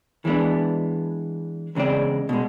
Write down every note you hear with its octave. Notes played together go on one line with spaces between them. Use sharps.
E3 G#3 B3 D4
E2 C#3 G#3 C4 D5
B2 G#3